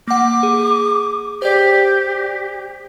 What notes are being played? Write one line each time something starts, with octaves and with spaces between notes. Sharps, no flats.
A#3 F#5 D6
G#4
G4 C5 D5